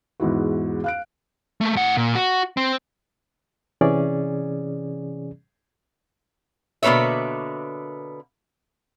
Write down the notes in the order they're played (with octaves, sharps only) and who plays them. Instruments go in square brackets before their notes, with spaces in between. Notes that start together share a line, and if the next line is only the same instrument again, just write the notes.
[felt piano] E2 G#2 E4 F#4
F5 F#6 D7
[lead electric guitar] A3 A#3
A2 F#5
A#2
F#4
C4
[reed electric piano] C3 E3 C#4 G#4 D5
[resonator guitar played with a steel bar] B2 D3 A#3 B4 C#5 E5